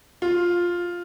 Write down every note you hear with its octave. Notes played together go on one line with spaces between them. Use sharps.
F4